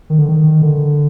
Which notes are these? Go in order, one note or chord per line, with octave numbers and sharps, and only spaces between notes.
D#3
D3
D#3
D3